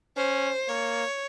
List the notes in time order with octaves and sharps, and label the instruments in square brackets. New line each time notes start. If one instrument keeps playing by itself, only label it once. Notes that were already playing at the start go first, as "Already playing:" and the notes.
[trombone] C#4 [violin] C5
[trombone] A#3 [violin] C#5